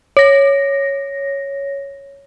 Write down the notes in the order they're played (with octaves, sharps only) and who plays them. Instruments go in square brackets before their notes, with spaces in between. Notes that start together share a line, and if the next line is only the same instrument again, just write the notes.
[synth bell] C#5 A#6